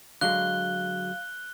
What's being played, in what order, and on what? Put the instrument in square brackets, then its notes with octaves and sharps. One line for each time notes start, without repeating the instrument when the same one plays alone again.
[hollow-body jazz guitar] D3 F#3 G#3 [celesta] F5 [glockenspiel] F#6 G7